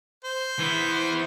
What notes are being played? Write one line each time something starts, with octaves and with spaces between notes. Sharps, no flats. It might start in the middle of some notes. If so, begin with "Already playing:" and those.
C5
E3 B3